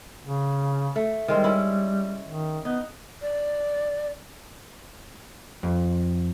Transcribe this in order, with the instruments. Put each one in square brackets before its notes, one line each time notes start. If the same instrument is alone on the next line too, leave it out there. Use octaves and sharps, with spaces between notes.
[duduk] C#3
[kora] A3
[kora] D#3 G#3 C4 [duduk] G3
[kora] C#4 E4
[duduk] D#3
[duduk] B3 [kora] D#4
[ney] D5
[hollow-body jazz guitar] F2